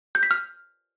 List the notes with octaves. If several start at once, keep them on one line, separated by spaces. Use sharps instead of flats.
G6
B6
F6